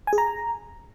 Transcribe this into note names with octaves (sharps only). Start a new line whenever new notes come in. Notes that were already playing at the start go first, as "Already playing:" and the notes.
G#5
G#4
A#5